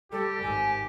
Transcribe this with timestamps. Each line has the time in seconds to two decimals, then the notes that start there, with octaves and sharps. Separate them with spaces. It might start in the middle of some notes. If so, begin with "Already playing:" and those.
0.12 G3 G4 A4
0.42 G#1 G#2 G#5